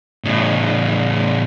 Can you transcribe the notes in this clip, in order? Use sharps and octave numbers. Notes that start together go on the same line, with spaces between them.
A2 C#3